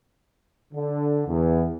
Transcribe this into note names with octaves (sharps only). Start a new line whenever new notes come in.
D3
E2